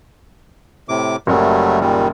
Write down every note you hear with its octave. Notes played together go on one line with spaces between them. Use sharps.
A2 C3 D6
F#1 F#3 G3 A3
A#2 D#3 G3